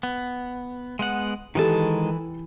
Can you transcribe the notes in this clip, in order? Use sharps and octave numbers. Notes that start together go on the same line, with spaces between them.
B3
G#3 B3 F#5
D#3 E3 G#3 G4 A4 A5